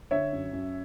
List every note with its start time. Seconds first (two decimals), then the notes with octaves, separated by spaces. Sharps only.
0.11 D3 C#5 E5
0.33 F#2
0.53 F#2